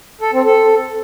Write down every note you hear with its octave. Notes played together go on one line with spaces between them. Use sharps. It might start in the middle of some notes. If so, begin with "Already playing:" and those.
A4
C4
A4